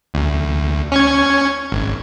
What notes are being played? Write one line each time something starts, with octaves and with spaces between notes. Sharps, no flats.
D2
C#4 C#6 G#6
G#1